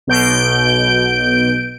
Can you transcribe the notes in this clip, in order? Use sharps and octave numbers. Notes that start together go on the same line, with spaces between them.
B1 B2 G6 D7